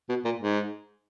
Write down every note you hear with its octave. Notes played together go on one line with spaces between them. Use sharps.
B2
A#2
G#2